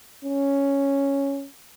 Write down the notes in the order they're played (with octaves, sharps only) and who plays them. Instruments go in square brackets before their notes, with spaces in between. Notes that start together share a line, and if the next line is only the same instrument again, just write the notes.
[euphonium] C#4